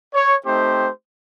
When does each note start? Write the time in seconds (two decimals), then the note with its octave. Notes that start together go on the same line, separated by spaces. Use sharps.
0.14 C#5
0.46 A3 C4 D#4 G4 C5